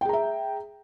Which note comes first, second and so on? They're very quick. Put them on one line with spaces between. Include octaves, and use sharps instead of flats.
G5 G#4 A#5 E5